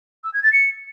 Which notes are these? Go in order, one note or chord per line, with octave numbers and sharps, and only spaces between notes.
E6
G#6
A6
C#7